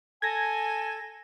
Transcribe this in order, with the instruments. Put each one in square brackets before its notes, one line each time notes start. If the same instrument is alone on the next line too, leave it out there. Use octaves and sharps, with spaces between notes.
[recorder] A4 [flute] G#5 [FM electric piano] G#6 A#6